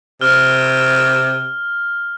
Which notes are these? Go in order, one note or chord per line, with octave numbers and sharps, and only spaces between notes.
C3 F6